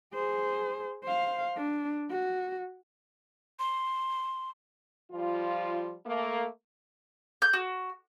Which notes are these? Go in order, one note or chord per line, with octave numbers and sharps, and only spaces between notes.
G#4 C5
C5 F5
D4
F#4
C6
F3 G3 F4
A3 A#3
G6
F#4